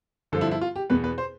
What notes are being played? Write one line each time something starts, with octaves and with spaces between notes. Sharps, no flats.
G2 D3 F3 A4
E4
E4
F4
G4
E2 B2 B3 B4
B4
C5